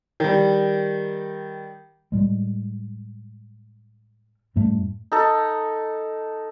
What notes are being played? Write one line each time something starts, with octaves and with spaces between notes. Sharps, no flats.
D#3 G3
A2 G3 G#3
F#2 A2 G3 A3
D#4 A4